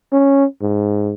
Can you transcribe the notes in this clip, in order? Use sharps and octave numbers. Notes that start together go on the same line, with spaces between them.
C#4
G#2